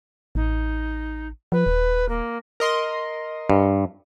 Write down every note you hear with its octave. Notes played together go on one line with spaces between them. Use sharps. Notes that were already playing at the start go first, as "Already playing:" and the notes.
A1 D#4
F3 B4
D#1
A#3
A#4 D#5 C6
G2